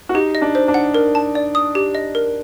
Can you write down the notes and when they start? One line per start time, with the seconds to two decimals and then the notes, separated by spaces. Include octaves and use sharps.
0.09 F#4
0.14 D#4 G4
0.35 D#5
0.42 D4
0.55 C5
0.68 D4
0.74 F#5
0.94 A#4
1.15 A5
1.35 D5
1.55 D#6
1.75 G4
1.95 D#5
2.15 A#4